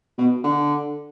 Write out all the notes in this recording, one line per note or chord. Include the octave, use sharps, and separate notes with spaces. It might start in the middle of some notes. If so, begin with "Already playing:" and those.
B2
D3